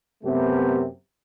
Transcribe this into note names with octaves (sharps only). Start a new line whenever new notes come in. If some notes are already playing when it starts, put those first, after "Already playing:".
F#2 C3 A3 B3 G4